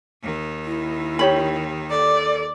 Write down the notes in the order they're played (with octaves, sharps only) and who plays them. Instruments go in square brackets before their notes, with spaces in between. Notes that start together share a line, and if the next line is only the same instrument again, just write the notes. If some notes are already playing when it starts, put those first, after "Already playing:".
[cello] D#2 D#3
[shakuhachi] E4
[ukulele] G4 C#5 B5
[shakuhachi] A4 [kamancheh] D5